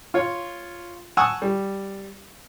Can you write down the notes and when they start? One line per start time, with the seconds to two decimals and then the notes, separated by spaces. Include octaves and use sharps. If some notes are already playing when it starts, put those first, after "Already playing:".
0.14 F4 C#5
1.17 F#5 G#5 A5 C#6 D#6 E6
1.42 G3